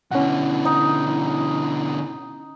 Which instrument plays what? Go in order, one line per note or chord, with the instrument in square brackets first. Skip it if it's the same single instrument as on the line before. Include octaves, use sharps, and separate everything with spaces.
[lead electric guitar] B2 D3 [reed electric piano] C#4 F#5 [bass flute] E4
[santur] D#4